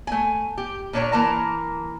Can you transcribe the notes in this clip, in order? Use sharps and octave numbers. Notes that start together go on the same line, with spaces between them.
A3 G#5
G4
A#2 D4 C#5 A#5
E3 A#3 A#4 A5 A#5